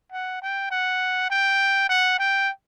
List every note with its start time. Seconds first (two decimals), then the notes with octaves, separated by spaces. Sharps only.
0.12 F#5
0.42 G5
0.71 F#5
1.31 G5
1.89 F#5
2.19 G5